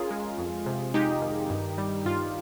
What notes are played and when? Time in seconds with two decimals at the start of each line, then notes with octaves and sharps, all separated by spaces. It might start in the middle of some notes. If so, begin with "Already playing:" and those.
Already playing: C#4 F4 G#4 A#4
0.11 G#3
0.38 F2
0.66 C3
0.94 G#3 D#4 G4
1.22 D#3
1.50 G2
1.78 G3
2.05 G2 F4